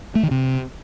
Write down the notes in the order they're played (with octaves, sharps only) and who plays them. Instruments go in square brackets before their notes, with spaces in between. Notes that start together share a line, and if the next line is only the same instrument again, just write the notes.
[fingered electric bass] A3
D#3
C3